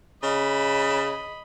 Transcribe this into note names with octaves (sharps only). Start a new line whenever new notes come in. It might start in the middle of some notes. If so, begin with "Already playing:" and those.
C#3 D#5 B5